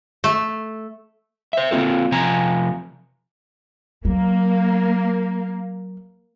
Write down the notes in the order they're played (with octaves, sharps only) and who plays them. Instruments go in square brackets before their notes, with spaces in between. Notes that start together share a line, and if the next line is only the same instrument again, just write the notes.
[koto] A3
[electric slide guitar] C5 E5
A#3 C4 F4 A4
C3 F3 G#5 A#5
[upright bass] F#3 [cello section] A#3